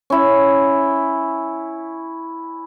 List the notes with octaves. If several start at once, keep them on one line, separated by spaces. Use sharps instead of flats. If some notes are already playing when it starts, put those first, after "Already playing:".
C#4 E4